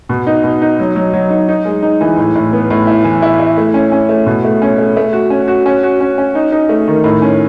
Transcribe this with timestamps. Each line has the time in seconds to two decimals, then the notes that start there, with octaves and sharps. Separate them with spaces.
0.09 B2
0.27 D#4
0.43 B2
0.62 D#4
0.79 F#3
0.96 F#3
1.13 F#3
1.30 D#4
1.49 D#4
1.65 G#3
1.83 D#4
2.01 E3
2.17 A2
2.35 A2
2.53 B3
2.70 A2
2.87 E4
3.04 E3
3.22 E4
3.39 E4
3.57 A3
3.74 C#4
3.92 C#4
4.09 A3
4.26 B2
4.44 A3
4.62 C#4
4.78 A3
4.96 A3
5.13 F#4
5.30 C#4
5.48 F#4
5.66 C#4
5.83 F#4
6.01 C#4
6.18 C#4
6.35 D#4
6.52 D#4
6.69 A3
6.87 D#3
7.04 A2
7.22 C#4